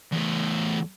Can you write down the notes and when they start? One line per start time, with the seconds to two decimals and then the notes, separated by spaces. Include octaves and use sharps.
0.12 E2 A3